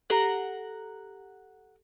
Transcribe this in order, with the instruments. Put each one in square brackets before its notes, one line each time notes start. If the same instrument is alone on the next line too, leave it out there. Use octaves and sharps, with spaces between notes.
[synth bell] G4 A4 F#7 [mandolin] F#5 A#5